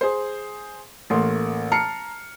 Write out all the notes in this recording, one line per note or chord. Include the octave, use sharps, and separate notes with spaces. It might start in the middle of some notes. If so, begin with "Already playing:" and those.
G#4 C5
A1 A3 A#3 C6
A5 A#5 F6 C7 C#7